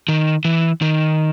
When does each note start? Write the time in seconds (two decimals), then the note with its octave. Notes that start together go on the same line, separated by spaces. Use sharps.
0.08 D#3
0.45 E3
0.82 D#3